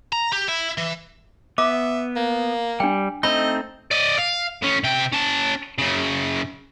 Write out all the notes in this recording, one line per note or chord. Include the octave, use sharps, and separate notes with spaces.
A#5
G4
E4
E3
B3 E5 D6
A#3
G3 D4 G5
A3 C4 D#4 D#5 B5
D5 D#5
F5
A2 C#4
C3 G5
C#4 A5
F#2 C#3